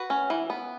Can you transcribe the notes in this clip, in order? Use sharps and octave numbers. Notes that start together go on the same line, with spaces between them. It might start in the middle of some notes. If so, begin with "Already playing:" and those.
Already playing: F#4 B4
C#4
E3
B3